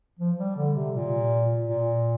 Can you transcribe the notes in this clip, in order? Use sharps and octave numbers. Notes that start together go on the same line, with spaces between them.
F3
G3
D3
C3
A#2
A#2